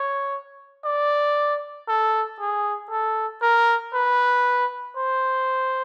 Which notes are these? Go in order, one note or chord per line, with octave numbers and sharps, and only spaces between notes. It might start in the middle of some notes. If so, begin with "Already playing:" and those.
Already playing: C#5
D5
A4
G#4
A4
A#4
B4
C5